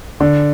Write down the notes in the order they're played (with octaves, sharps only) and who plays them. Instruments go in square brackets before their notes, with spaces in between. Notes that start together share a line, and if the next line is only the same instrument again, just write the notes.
[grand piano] D3